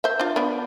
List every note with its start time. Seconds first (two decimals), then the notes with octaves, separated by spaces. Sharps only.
0.04 C5 E5
0.19 D4 F4
0.36 B3 D4